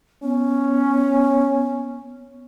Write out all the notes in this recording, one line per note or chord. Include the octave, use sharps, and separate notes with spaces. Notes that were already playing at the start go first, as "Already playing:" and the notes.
B3 C#4